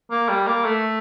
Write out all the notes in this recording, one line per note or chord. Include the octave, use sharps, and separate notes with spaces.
A#3
G3
A#3
A3